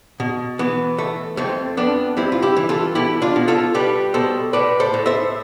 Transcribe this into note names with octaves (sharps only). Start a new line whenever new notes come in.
B2
E3 B3
A3
F2 A3 C4
F2 B3 D4
G2 C4 E4
F4
E4 G4
E3
F4 A4
B2 E4 G4
D4 F4
B2
F4 A4
G3 G4 B4
B2 A4 C5
A2 B4 D5
A4 C5
A2
C5 E5